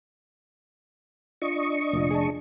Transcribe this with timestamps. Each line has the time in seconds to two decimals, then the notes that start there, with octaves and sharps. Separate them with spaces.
1.42 D4 F4 D#5 C#6
1.93 F1 A#2 F4
2.11 G#4 A5